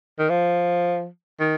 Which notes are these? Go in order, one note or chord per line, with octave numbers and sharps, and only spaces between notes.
D#3
F3
D#3